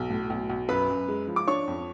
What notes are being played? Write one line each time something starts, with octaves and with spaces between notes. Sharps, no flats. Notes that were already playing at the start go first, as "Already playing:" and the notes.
Already playing: B1
A2
B1
B1
F#2 B4 B5
F#2
G#3
F3
D6
D4 C#5 C#6
F2